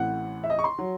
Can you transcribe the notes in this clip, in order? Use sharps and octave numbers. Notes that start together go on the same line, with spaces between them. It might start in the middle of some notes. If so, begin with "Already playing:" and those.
Already playing: A1 A2 E3 C4 F#5
E5
D#5
C#6
C6
F#3